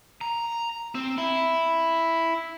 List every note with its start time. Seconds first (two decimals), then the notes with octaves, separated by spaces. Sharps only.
0.21 A#5
0.95 C4
1.18 E4